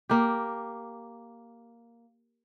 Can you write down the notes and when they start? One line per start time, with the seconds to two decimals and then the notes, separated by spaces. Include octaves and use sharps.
0.09 A#3 G4